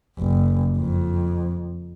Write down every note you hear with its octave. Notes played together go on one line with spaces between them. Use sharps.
F#1
F2